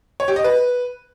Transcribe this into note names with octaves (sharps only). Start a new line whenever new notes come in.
C#5
G4
D#5
B4